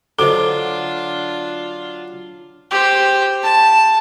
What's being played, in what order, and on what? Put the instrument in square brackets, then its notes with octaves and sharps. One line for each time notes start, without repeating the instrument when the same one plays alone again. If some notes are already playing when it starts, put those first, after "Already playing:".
[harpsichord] D3 F#3 [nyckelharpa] D4 F4 [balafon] A4 C5 D#5 [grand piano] D6
[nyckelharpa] G4 C5
A5